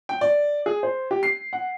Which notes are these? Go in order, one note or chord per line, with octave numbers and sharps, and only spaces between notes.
G5
D5
G#4
C5
G4
C7
F#5